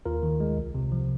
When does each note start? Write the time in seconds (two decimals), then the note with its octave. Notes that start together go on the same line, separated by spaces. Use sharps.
0.06 D#2 F4 A#4
0.23 D#3
0.40 G#3
0.57 C2
0.75 C3
0.92 F3